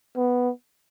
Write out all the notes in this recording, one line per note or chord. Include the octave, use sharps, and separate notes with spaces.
B3